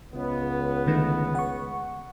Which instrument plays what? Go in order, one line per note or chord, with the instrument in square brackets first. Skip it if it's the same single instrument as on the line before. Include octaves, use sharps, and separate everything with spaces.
[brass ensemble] C#2 B3
[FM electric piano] D3 D#3 A3
F#5 C#6